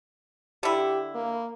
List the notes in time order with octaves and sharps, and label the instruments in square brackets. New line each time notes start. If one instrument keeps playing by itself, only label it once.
[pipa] D3 E4 [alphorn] G4
[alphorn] A#3